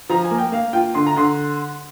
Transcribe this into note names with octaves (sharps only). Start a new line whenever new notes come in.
F3 A#5
G#5
A#3
G5
A#3 F5
F4 G5
D3 C6
A#5
D3 C6